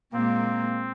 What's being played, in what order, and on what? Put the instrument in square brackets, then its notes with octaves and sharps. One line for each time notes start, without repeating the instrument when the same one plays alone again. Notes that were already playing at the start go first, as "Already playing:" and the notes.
[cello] A#2 G#3 [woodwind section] A#3 [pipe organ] C4